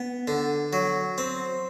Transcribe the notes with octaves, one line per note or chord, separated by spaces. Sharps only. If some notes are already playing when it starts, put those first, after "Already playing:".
Already playing: B3
D3
F#3
C4